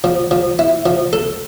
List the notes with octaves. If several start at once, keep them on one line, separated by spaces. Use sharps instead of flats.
F3
F3
E4
F3
A4